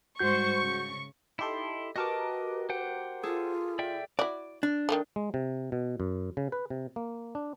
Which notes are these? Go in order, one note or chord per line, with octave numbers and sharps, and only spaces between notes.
G#2 G3 F#4 C5 C#6 G6
C#3
D#4 E4 G4 A4 C6
F#4 G4 A#4 B4 D#5 A5 D6
C5 F#5 G5
F4 G#4 A4
D5 E5 G5
E4 F#4 D5
D4
D#3 F3 A3
G#3
C3
B2
F#2
C#3
B4
C3
A#3
D4